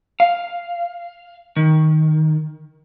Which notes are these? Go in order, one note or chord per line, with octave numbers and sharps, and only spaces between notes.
F5
D#3